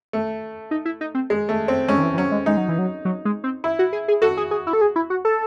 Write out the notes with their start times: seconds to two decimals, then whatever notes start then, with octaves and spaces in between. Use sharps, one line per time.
0.13 A3
0.71 D#4
0.85 E4
1.01 D#4
1.15 C4
1.30 G#3
1.49 A3
1.68 C4
1.88 G#3 C#4
1.98 D#3
2.03 E3
2.14 E3
2.18 F#3 C#4
2.32 G#3
2.46 G#3 D#4
2.57 F#3
2.69 E3
2.79 F#3
3.05 F#3
3.25 G#3
3.44 C4
3.64 E4
3.79 F#4
3.93 G#4
4.08 G#4
4.22 F#4 A4
4.37 G#4
4.51 G#4
4.67 E4
4.73 A4
4.81 G#4
4.96 E4
5.10 F#4
5.25 A4